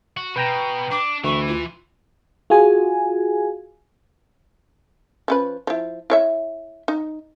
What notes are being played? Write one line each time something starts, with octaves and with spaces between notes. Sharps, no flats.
F#4
B2 B4 G5 A#5
D4 D6
D2 E3 C#6
F4
F4 F#4 G#4 G#5
F3 C#4 B4
F3 E4
E4 C#5 E5
D#4